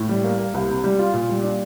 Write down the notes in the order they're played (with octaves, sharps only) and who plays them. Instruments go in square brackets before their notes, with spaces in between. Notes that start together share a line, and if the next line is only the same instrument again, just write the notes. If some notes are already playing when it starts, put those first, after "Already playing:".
Already playing: [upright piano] A2
G3
A#3
A#3
C2
C3
G3
F4
A#2
G3
D4